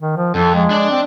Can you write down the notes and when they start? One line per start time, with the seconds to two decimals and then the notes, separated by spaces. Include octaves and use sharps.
0.01 D#3
0.17 F3
0.35 F2 A4
0.55 G#3
0.70 D4 D5
0.90 C4